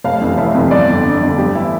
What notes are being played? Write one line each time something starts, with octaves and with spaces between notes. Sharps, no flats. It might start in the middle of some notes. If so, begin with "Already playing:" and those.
F1 F5
F2 C3 E3
F1 E5
F2 C3 E3
G1 D5
F2 D3
G1
F2 D3
G1 G4
E3 E4